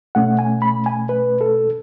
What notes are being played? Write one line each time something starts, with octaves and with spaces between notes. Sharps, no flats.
B2 A3 C#4 F#5
G#5
B5
G#5
B4
A4